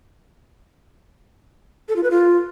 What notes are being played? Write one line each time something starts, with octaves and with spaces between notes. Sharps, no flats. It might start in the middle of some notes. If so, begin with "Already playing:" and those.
A4
F4
B4
F4